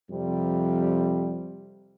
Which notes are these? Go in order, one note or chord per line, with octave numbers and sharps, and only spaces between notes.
F2 C3 G3